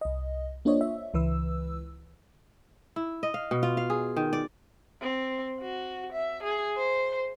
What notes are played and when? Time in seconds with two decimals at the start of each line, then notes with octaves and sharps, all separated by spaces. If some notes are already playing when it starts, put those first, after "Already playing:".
0.01 C2 D#5
0.65 A#3 D4 F4 C5 C#5 D#5
0.81 E5
1.14 C#2 E3 B4 E6
2.96 E4
3.23 D#5
3.34 F5
3.51 B2
3.63 F4
3.77 F5
3.90 G#4
4.16 D#3
4.33 D5
5.01 C4
5.60 F#4
6.12 E5
6.43 G#4
6.77 C5